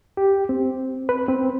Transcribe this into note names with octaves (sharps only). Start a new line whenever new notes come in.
G4
C4
B4
C4